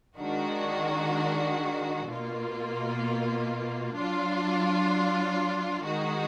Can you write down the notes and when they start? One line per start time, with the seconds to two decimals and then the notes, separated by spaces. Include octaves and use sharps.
0.19 D#3 G#3 D4 F#4
2.08 B2 A#3 F4
3.96 F#3 D4 F4
5.84 D#3 G#3 D#4 F#4